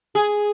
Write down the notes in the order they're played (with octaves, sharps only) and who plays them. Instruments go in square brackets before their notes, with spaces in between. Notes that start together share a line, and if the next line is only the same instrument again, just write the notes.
[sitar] G#4